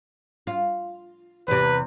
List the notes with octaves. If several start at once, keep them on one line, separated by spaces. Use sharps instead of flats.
F4
E2 C3 B4